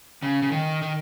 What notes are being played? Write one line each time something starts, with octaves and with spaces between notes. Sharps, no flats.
C#3
C#3
D#3
D#3